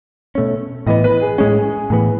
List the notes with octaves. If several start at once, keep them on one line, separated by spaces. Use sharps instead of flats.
B2 A3 C#4
A2 E3 B3 D#5
B4
G#4
A2 G#3 C#4 G#4
A2 E3 B3